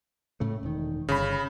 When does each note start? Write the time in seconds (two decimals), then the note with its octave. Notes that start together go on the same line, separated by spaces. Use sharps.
0.40 A2 C#3 A3
0.63 E1 D#3
1.08 G1 C#3 B5